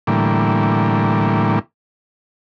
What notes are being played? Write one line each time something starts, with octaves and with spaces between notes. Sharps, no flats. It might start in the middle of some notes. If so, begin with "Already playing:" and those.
A2 D3 E3 G3 A#3